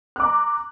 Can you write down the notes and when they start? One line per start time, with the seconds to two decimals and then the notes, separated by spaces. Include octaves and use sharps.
0.16 F#6
0.20 D6
0.24 A#5